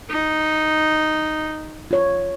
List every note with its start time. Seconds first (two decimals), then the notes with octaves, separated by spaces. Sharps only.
0.10 D#4
1.91 F4 C#5